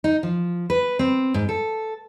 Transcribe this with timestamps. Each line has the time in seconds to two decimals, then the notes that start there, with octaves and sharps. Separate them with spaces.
0.04 D#4
0.23 F3
0.70 B4
0.99 C4
1.34 G#2
1.49 A4